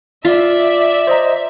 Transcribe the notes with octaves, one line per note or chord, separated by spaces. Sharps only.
F4 D5 E5
C5 D#5 A#5